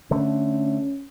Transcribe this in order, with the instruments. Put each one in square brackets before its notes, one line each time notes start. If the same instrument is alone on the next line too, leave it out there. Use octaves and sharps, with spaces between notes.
[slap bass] D3 A3 [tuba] C#4